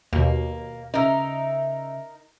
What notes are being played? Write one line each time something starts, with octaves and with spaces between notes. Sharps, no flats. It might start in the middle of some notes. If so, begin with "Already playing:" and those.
D#2 B2 A#3
C#3 D#4 A#4 E5